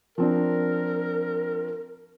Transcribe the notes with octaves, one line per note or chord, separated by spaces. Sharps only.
F3 C4 D4 A#4